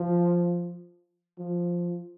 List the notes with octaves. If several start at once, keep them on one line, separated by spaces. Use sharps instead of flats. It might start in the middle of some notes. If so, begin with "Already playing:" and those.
Already playing: F3
F3